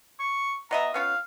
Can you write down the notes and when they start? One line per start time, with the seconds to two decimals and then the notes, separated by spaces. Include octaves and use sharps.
0.20 C#6
0.71 B2 D#5 E5 A#5
0.94 B3 C#4 F4 F5